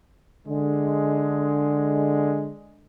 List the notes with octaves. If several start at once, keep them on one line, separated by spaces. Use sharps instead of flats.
D3 G#3